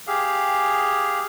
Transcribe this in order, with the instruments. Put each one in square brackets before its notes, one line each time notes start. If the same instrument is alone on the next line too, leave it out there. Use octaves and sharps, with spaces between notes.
[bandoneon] G4 G#4 F5